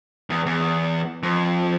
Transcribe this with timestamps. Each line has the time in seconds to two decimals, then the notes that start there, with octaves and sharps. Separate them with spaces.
0.30 E2
0.46 E2
1.23 F2